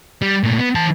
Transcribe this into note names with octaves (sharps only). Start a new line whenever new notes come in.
G3
A#2 A3
B3
E3 A5